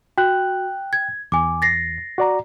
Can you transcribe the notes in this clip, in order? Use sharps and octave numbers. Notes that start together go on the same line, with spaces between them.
F#4 G5 F#6
G#6
E2 G#5 D6
A6 A#6 C7
F#4 D5 A#5